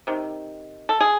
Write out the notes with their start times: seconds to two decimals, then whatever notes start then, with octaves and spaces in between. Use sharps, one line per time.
0.07 C3 D#3
0.89 A4
1.00 G#4